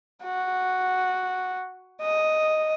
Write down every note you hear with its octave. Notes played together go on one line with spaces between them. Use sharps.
F#4
D#5